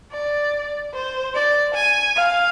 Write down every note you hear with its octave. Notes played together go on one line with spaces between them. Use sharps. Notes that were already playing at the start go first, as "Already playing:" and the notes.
D5
C5
D5
G#5
F5